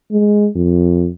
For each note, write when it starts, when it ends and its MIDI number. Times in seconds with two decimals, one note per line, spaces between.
0.11 0.48 56
0.55 1.09 41